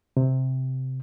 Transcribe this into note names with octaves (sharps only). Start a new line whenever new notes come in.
C3